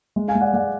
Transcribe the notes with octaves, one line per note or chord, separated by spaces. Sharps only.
G#3
F5 G#5
G#3
D5 F#5
G#3 D5 F#5